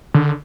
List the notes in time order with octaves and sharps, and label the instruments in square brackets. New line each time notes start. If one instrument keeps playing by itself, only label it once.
[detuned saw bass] D3